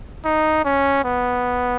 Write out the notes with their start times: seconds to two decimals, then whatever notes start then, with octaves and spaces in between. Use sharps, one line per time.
0.25 D#4
0.65 C#4
1.05 B3